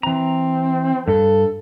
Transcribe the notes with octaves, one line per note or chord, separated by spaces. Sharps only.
E3 C4 A#5
G2 A4